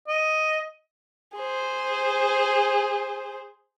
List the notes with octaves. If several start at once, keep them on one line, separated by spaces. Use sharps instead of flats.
D#5
G#4 C5